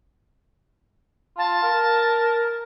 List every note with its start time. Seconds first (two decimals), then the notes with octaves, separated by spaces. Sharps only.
1.38 F4 A5
1.63 A#4